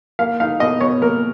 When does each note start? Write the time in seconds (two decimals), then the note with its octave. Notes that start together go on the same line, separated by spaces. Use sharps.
0.19 A#3 F5
0.40 D#4 F5
0.60 B2 D#5
0.81 B2 C#5
1.02 A#3 A#4